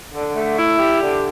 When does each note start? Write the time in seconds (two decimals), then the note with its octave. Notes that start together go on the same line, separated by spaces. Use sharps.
0.15 D3
0.36 A3
0.58 E4
0.79 G4
1.01 D3